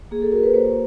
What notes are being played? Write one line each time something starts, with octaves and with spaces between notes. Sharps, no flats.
A#3 G#4
A4
F#4 A#4
B4
A#3 C5